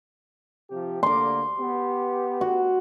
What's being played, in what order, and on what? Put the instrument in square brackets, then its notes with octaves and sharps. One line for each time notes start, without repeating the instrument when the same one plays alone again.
[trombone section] C3 F3 G4
[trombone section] D3 A#3 [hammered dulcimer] C6 D6
[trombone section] B3 G4
[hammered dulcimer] F#4